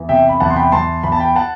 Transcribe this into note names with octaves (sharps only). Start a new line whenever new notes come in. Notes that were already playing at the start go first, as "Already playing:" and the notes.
Already playing: E2
C3 E5 G5
B5
E2 F#5 A5
C6
G5 B5
E2 A5 C6
E2 B5
A5
G5 B5
F#5 A5